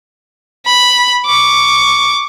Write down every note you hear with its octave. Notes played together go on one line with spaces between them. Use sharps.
B5
C#6 D6